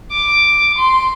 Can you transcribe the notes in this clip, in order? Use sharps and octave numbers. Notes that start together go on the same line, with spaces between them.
D6
C6